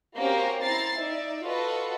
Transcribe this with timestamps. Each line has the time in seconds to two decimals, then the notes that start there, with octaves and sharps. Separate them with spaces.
0.17 A#3 C4 C#4 F#4 G4 A#4
0.62 C4 E4 A#5 A6 C7
0.98 D#4 D5 E5
1.44 F4 F#4 A4 B4 D#5